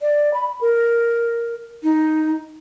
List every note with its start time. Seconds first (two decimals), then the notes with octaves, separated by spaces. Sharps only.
0.01 D5
0.34 B5
0.61 A#4
1.83 D#4